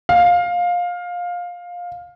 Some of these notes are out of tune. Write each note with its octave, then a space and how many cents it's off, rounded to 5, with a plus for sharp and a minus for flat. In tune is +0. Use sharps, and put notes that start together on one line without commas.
F5 +15